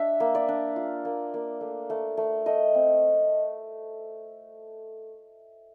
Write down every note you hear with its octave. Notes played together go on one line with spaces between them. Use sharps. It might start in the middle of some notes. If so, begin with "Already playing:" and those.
Already playing: D4 E5
A#3
D5
D4
F4
A#3
A#3
A3
A3
A3
A3 D#5
C4